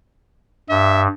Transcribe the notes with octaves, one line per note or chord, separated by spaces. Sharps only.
G2 E5